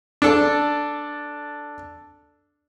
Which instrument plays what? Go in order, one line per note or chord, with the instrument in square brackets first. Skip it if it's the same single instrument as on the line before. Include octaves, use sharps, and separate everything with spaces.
[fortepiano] D4 A4